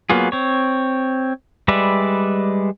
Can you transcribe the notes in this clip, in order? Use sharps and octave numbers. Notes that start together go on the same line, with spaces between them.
F#3 A#3 B3 F4 G#4
C4 C#5
G3 G#3 B4 D5 E5